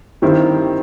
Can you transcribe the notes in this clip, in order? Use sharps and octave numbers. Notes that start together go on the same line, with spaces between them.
G2 D#3 G3 C4 E4